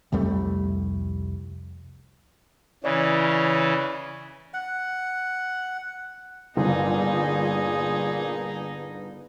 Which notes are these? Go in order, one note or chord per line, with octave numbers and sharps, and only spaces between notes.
C2 F2 G3 A3
C#3 E3 C#5 D5
F#5
G1 A#2 D#4 G#4